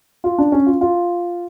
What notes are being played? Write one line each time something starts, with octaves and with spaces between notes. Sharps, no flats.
F4
D4
C#4
F4
F4